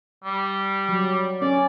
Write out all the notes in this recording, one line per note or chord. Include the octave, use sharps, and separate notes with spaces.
G3
F#3
C#4 D5